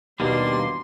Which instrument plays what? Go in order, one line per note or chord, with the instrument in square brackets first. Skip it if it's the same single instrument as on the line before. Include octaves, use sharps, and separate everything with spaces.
[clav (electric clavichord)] D#2 B2 [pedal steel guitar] G3 A#3 D4 [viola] C6